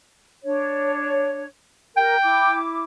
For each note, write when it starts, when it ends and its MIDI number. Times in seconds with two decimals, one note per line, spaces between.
0.44 1.44 62
0.44 1.44 73
1.97 2.15 67
1.97 2.15 70
1.97 2.53 79
2.23 2.84 64
2.23 2.84 86